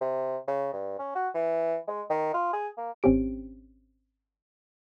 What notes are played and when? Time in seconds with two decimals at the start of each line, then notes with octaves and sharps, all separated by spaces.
0.01 C3
0.47 C#3
0.73 G2
0.99 C#4
1.15 F#4
1.34 E3
1.88 G#3
2.10 D#3
2.34 F4
2.53 G#4
2.77 A#3
3.03 G#1 C4 C#4 G4 D7